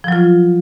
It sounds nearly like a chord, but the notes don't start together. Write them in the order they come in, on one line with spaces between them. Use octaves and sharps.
F3 F#3 F4